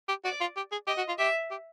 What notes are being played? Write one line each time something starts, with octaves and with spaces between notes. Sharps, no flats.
G4
F#4 D5
F4
G4
G#4
G4 D#5
F#4
F4
G4 E5
G4